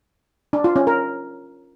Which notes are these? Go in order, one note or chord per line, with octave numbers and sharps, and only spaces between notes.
D4
F4
C#4
A#4